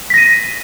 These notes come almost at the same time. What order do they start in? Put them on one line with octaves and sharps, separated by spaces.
B6 A#6 D#7